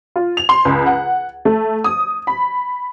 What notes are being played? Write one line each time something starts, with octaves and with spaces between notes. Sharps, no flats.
F4
F7
C6
C#2
F#5
A3
D#6
B5